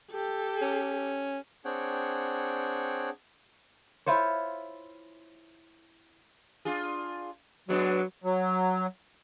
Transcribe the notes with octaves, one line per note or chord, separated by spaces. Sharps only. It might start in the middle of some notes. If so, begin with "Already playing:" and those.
G4 A4
C#4
C4 D4 G#4 C#5 F#5 G5
E4 F4 C5 C#5
D4 F4 G#4
F#3 G#3 B3 D4
F#3